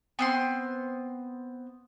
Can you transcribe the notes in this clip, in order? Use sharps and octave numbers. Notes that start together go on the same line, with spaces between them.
B3 C4 C6